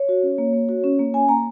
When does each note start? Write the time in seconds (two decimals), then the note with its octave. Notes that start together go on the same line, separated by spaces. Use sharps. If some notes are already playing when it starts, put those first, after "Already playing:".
Already playing: C#5
0.09 F#4
0.23 C#4
0.38 A#3
0.53 A#3
0.69 F#4
0.84 C#4
0.99 A#3
1.14 C#4 G#5
1.29 A#3 A#5